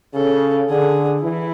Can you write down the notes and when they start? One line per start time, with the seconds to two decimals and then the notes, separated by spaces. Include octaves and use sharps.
0.14 C#3 A4
0.69 D3 G#4
1.23 E3 E4